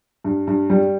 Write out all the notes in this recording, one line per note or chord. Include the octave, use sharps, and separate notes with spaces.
G2
G2
G3